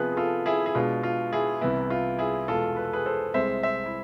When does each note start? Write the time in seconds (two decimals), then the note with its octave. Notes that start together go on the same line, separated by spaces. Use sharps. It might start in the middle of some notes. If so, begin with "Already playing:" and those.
Already playing: C3 F3 B3 G#4 B4
0.12 G#4
0.17 F4 A4
0.46 E4 G#4
0.66 G#4
0.75 B2 G#3 D4 F4
1.03 F4
1.33 E4 G#4
1.61 C2 C3 E3 B3 E4
1.90 F4
2.19 E4 G#4
2.48 E2 B2 G#3 F4 A4
2.76 B4
2.85 A4
2.93 G#4 B4
3.06 A4 C5
3.34 C2 C3 G#3 C4 C5 E5
3.63 C5 E5
3.86 E4